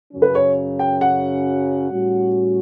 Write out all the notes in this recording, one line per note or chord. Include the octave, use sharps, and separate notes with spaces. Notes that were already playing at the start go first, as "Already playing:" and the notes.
F#2 C#3 F#3 C#4
B4
C#5
G5
F#5
A2 G3 C#4 F#4